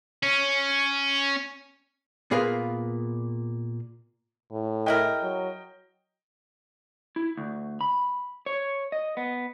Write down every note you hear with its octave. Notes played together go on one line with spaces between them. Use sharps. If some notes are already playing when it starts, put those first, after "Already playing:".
C#4
A#2 B3 G#4 A#4 B4 F5
A2
G#3 E4 A#4 D#5 G5
F#3
E4
D2
B5
C#5
D#5
B3